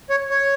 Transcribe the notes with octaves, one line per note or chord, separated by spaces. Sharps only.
C#5
C#5